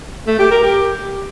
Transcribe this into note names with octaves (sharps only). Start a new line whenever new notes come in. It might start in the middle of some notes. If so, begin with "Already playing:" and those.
A3
G4
A#4
G4